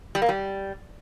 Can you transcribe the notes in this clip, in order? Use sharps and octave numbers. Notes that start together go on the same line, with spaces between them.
G3
A#3
G3